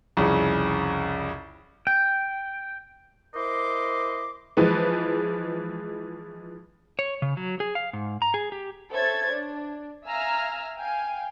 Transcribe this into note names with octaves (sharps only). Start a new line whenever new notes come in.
C2 F2 C#3
G5
E4 A#4 C5 D#5 C6 D6
E3 F3 G#3 B4
C#5
C#3
F#3
G#4
F5
G#2
A#5
G#4
G4
A4 C5 C#5 E5 G#6 A6
D4
E5 F5 G#5 A#5 E6 F6
F5 G5 G#5